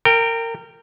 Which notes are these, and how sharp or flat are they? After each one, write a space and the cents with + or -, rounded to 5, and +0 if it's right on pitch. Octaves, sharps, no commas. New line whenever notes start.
A#4 -25 G5 +5